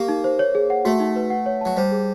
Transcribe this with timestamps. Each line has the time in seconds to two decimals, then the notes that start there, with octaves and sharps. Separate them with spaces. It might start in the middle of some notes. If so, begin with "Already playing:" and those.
Already playing: A#3 G4
0.09 D#4
0.24 C5
0.39 C#5
0.55 G#4
0.70 F#5
0.85 A3 F#4
1.00 D#4
1.16 B4
1.30 F#5
1.46 C#5
1.61 F#3 A5
1.77 G3 C5
1.92 G#4